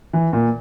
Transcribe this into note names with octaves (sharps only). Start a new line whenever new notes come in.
E3
A#2